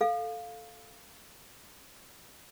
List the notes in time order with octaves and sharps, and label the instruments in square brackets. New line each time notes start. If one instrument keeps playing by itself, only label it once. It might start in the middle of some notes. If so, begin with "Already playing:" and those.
[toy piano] A4 F5